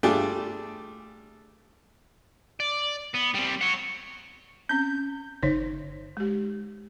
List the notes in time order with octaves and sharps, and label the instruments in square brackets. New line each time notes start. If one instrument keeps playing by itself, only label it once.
[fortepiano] G3 A3 D4 F4 G#4 G5
[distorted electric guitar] D5
B3
G3 C4
C#5 F#5
[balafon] C4 C#4 [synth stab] G6
[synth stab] G1 [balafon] D#4 C5 C#5
[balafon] G#3 G4